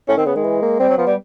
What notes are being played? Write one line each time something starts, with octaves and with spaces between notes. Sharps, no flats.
A2 C#4
D#3 C4
C#3 B3
D#3 G#3
E3
A#3
G3 C4
F#3
F3 B3
G3